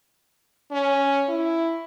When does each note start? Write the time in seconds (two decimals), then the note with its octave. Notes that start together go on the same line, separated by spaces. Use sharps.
0.71 C#4
1.29 E4